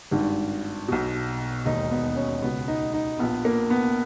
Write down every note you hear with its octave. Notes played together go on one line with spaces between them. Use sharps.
G#1 G2 D#3
B1 B2
E1 D#2 D#3 D#4
B3
C#4
C#2 B2 B3
D#4
D#4
A#1 A#2 B3
A#3
B3